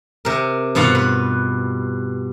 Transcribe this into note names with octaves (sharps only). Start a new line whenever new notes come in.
C3 A#4
G2 B2 F4 F5 F#5
B4